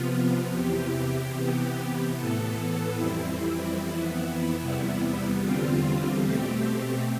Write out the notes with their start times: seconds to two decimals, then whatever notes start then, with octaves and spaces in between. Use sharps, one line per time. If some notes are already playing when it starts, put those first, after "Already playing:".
Already playing: C3 F3 B3 F4
0.53 E2 C3 E3 G4
1.34 C3 E3 B3
2.16 A2 E3 B3 A4
2.97 F2 E3 G3 C4 E4
3.79 F2 E3 B3
4.60 E2 C3 G3 B3
5.41 E2 D3 G3 C4 F4
6.22 B2 A3 C4 G4